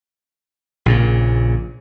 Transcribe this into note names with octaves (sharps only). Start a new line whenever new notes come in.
A#1 A#2 C#3